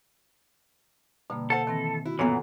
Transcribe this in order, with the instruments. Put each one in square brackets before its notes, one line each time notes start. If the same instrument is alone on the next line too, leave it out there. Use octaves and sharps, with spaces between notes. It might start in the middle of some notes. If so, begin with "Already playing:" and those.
[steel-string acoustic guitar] G2 [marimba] B2 D3 A#3
[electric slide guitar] A4 [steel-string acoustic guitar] C5 F5 F#5
[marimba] D#3 C4 A#6 [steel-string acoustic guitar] E3
[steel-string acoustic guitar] E4 [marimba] F#4
[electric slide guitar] F#2 A#2 E3 [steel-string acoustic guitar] F#3 B3 [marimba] A4